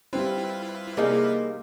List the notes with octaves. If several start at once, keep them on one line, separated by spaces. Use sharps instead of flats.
G3 C4 E4 F4 B4
C3 A#3 D#4 G#4 D#5 F5